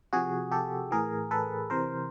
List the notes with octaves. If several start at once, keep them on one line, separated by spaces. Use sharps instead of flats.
C3 F3 F#4 G#4
G4 A4
A2 E3 G#4 A#4
A4 B4
C3 E3 A#4 C5